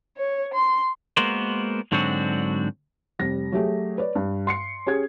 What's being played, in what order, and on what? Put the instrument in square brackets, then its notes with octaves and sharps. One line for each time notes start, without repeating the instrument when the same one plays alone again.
[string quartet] C#5
C6
[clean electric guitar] G#3 A#3 B3 F#4 A#4 C5
G#2 D3 F#3 C4 D4 F#4
[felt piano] F1 G3 A#6
F#3 A3 G4 G#4
B4 C#5 D5
G2
C6 C7 C#7
C#4 G4 G#4 G#6